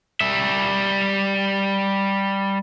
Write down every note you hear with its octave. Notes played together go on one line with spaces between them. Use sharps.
G3 E5